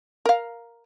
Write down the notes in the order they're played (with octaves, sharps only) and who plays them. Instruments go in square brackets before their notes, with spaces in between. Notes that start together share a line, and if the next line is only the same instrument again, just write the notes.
[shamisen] A#4 F5